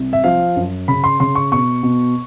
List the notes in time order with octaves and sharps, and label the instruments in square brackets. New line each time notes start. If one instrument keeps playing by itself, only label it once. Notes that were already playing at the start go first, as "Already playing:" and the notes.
Already playing: [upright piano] C2
E5
F3 F5
F#2
C#3 B5
C6
C#3 C6
C#6
B2 C#6
B2